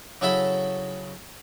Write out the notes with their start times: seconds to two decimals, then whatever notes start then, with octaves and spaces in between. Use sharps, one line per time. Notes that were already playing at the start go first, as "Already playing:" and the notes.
0.21 C#3 F#3 E4 A4 E5 B5